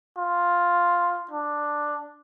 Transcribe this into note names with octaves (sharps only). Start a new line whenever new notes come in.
F4
D4